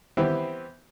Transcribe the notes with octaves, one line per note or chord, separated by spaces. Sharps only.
E3 B3 C4 E4 G4 C5